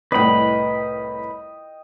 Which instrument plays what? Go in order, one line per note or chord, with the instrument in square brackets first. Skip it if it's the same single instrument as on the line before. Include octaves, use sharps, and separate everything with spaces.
[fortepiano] C2 A2 [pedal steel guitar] B4 B5 [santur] D#5 G5